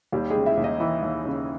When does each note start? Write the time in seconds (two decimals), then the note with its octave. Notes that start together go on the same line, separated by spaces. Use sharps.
0.12 D#2 G3 G4
0.30 G#3 G#4
0.35 C#3
0.46 E4 E5
0.57 D#2
0.64 D#4 D#5
0.80 E3
1.02 D#2
1.25 C#3